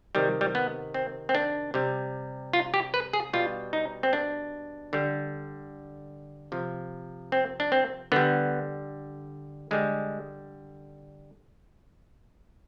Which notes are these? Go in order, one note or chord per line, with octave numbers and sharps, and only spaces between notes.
C3 D#3 G3
G3
B3
C4
C4
D4
C3 G3
F4
G4
B4
G#4
B2 G3 F4
D#4
C4
D4
D3 G3
C3 F3
C4
D4
C4
D3 G3 B3
D3 G3 G#3